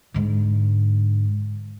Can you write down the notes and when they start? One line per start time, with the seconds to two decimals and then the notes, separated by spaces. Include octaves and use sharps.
0.14 G#2 D3